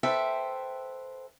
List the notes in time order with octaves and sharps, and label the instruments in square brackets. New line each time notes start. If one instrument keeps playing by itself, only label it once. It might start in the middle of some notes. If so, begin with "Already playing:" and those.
[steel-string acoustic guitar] A4 B4 C5 E5 G5